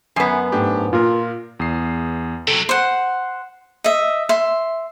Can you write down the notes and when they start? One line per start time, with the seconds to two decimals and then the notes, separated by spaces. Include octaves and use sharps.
0.16 F#2 B3 G#5 C7
0.52 G#2 A3 D4 G4
0.93 A#2 F4 A#4
1.60 E2 D#6 C7
2.47 C3 F#3 A4
2.69 C5 F#5
3.84 D#5 E5
4.29 E5 C6